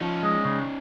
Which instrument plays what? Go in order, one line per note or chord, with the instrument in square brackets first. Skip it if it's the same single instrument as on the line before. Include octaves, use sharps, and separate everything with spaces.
[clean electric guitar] F3 [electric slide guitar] C#4 D#4
[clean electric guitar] G#3
C#3